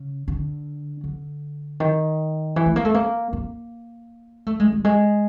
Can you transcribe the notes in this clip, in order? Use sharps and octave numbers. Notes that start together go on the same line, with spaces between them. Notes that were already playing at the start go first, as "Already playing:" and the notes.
Already playing: C#3
D3
D3
D#3
E3
A3
A#3
A3
A#3
A#3
A3
G#3
G3
G#3